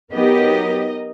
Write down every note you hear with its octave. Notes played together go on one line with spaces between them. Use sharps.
F#3 B3 D#4 G4 A#4 D#5